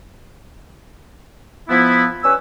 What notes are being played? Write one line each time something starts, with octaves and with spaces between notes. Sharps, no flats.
F3 B3 E4
G2 C#4 B4 E6